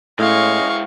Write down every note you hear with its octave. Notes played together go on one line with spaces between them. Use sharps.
A2 G#3 C#4 E4 D#5 F5 C#6